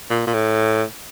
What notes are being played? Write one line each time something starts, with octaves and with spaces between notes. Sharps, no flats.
A#2
A#2
A2